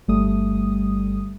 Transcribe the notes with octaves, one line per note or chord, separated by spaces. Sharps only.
G1 G3 A3 D#6